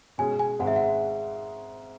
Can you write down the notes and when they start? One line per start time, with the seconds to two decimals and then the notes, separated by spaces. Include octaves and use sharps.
0.18 B2 G#3 C#4 G#4 G#5
0.39 G#5
0.59 G#1 G#2 G#3 F#5
0.67 E5
0.76 F#5